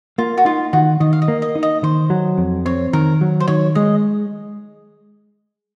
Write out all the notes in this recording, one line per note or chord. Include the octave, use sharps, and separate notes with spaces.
A#3 F4
F#4
D#4 F4
D#3 F#4
D#3 D#5
F5
D#5
A#3
D#5
D#4
D#5
D#3 C5
F#3
F2
C4 C#5
D#3 A#4
F#3
C5
D#3 C#5
G#3 D#5